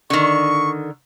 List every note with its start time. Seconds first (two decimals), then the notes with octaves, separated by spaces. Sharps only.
0.10 D3 D#3 C#6